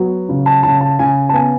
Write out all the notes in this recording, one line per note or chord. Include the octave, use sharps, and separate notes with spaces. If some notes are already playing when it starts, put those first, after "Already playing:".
Already playing: F#3 B3
C#3
A5
C#3 A5
A5
C#3 G#5
A5
B3 G#5